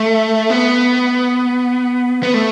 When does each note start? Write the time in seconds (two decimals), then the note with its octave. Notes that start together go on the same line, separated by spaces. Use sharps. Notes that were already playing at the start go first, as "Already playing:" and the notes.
Already playing: A3
0.50 B3
2.23 B3
2.34 A3